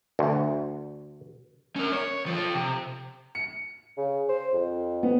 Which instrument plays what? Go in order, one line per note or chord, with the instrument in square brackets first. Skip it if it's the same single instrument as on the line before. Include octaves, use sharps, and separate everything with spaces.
[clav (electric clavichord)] D2
[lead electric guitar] C#4 A#4
C#5
F3 A4
C3
[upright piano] C#7
[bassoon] C#3
C5
F2
[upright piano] B3